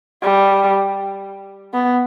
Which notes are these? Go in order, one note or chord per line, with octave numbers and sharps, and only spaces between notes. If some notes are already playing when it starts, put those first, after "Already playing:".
G3
B3